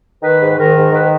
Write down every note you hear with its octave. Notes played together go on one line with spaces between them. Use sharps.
D#3 B4
G#2
D#3 A#4
G#2
D#3 B4